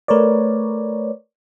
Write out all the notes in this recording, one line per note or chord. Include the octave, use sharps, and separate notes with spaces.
A3 A#4 B4 C#5 D5